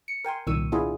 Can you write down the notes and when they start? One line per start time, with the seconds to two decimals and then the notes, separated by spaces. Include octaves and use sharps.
0.08 C#7
0.25 A#4 G5 G#5 C6
0.47 C2 A#2 D#3 C#6 E6 D#7
0.72 B3 D4 E4 F4 G#4